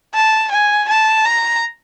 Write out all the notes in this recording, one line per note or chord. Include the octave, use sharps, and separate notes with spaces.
A5
G#5
A5
A#5